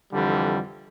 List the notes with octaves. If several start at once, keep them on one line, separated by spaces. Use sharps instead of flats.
F2 D3 E3 G3